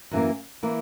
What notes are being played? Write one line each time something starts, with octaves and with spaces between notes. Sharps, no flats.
F#2 E3 A#3
E3 A#3